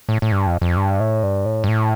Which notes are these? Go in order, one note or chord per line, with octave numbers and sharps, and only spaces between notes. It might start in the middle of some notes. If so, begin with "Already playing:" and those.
A2
A2
G2
F2
F2
G2
A2
G2
A2
G2
A2